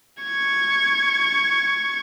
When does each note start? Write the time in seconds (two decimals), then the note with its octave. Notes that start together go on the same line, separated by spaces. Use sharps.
0.23 C#6 G#6